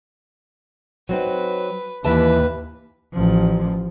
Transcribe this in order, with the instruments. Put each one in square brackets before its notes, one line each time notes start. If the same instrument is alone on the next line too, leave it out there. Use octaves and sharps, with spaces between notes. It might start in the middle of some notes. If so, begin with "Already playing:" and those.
[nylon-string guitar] F#3 C4 D#4 [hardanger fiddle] B4
[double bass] D#2 [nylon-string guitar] E3 E5 A5 [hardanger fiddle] B4
[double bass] A1 F3